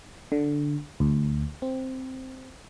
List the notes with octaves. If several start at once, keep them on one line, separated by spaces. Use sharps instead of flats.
D3
D2
C4